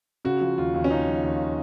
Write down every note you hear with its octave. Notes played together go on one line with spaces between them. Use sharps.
C#3 F#4
F3
D#2 F4
D#2
C#4
C#3 D#4
F3
D#2